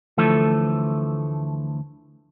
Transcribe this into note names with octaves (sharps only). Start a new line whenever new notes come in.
D2 E3 F3 A3 A4